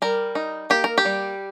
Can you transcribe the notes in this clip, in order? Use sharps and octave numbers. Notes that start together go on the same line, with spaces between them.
G3 A#4
D#4
A#3 G4
A#4
G4
G3